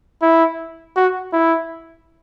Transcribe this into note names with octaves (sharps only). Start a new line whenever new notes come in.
E4
F#4
E4